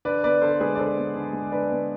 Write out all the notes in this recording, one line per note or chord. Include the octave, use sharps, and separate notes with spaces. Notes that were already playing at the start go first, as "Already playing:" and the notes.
D3 B4 D5
B3 B4 D5
D3 A4 C5
G#3 G#4 B4
D5
D3 A4 C5
B3
D3
G#3
D3 B4 D5
B3